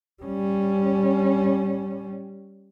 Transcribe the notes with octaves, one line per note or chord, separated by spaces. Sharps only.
G3 C#4